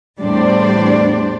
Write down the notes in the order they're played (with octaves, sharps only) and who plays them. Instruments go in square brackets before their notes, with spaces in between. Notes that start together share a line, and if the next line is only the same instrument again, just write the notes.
[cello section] E2 A2 G3 D4 C5 D5